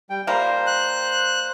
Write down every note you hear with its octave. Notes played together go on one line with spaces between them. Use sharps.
G3 G5
F3 G3 A#3 C5
F#6